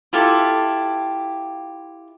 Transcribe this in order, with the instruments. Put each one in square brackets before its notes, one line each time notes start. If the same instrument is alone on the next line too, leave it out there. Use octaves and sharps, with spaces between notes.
[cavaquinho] E4 F4 G4 A4